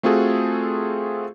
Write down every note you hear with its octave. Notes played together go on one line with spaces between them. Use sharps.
A3 C4 F4 F#4 G#4 A4